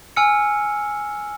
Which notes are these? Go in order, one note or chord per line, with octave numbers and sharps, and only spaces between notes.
G#5 E6 F6 C#7